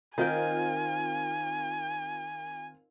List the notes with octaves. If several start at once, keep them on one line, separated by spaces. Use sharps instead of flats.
D#3 C4 F4 A#4 G5 G#5